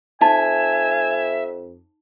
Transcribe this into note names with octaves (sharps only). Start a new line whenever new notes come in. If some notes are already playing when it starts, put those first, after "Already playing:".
F2 D#4 E5 G#5 A5